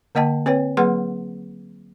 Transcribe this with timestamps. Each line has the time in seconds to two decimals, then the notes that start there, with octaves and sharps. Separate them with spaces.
0.15 D3 A#3 D#5 G5 A5
0.46 C4 B4 C#5 G5
0.77 F#3 A#3 G#4 B4 F#5 C6